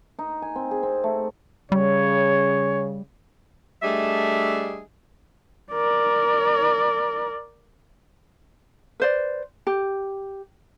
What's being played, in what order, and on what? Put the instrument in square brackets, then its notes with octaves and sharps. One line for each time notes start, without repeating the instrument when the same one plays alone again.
[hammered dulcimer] D#4
G#5
C4
G#4
C4
A3
[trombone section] C#3 [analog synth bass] G3 [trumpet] C#5
[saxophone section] G3 A3 D4 G#4 D#5 E5
[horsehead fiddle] A#4 D5
[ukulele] B4 C5 D5
G4